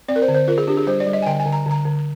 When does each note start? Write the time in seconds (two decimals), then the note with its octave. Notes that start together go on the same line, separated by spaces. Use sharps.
0.08 C4 D5
0.16 A#4
0.22 C5
0.28 D3
0.35 C5
0.48 F4 A#4
0.58 G#4
0.67 D4 G4
0.77 G#4
0.87 G3 C5
1.00 D5
1.07 G3
1.13 D#5
1.22 G#5
1.26 D3 G5
1.40 G#5
1.46 D3
1.53 A#5
1.66 D3 A#5
1.85 D3